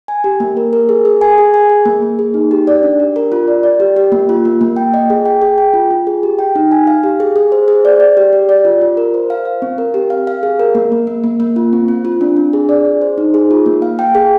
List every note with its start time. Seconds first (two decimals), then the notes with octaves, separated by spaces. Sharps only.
0.08 G#5
0.24 G4
0.40 A#3
0.57 A#4
0.73 A#4
0.89 G#4
1.05 G#4
1.21 G#5
1.38 G#4
1.54 G#5
1.69 G#4
1.85 A#3
2.02 A#3
2.19 G#4
2.34 D#4
2.51 G4
2.67 D5
2.83 D4
3.00 G4
3.16 A#4
3.32 F4
3.48 D5
3.63 D5
3.80 G4
3.96 G4
4.12 A#3
4.29 F4
4.45 A#3
4.61 A#3
4.76 G5
4.94 D#5
5.10 G#4
5.25 G5
5.42 G#4
5.58 G5
5.74 F4
5.91 F4
6.07 G#4
6.23 G4
6.39 G5
6.55 D#4
6.71 G#5
6.87 F5
7.03 G4
7.20 G#4
7.36 G#4
7.52 C5
7.68 G#4
7.85 D5
8.00 D5
8.17 G4
8.33 G4
8.49 D5
8.65 F4
8.81 F4
8.97 A#4
9.14 C5
9.30 F5
9.45 F5
9.62 C4
9.78 A#4
9.94 G4
10.10 F5
10.27 F5
10.43 G#4
10.60 A#4
10.75 A#3
10.92 A#3
11.07 A#3
11.24 A#3
11.40 A#3
11.56 F4
11.73 C4
11.88 C4
12.05 F4
12.21 D4
12.36 D4
12.53 G#4
12.69 D5
12.85 G#4
13.01 C5
13.18 D#4
13.34 G#4
13.51 F4
13.66 A#3
13.82 F5
13.99 G5
14.15 G#4